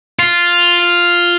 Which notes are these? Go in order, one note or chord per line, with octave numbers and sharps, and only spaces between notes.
F4